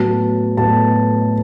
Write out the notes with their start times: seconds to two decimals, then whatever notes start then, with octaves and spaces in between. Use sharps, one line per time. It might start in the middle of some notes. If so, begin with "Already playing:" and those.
Already playing: A2 F#3 B3 A5
0.57 A2 F#3 B3 A5